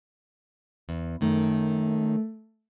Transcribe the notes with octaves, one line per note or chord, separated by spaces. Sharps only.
E2
F#2 D#3 A3